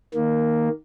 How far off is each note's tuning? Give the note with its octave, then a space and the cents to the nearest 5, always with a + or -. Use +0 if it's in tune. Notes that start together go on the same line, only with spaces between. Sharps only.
D#3 +5 A#3 +0